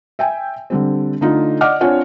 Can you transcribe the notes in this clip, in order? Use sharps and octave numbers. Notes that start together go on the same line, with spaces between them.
E5 G5 G#5
D3 G3 C4
D3 A3 D4 D#4 F4
D5 D#5 F#5 D6 F6
C4 D4 F4 C#5 F#5 G#5